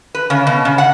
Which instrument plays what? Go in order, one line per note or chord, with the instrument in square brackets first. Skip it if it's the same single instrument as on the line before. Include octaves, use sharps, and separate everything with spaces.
[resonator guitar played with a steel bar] B4
C#3
B2
C#3
F#5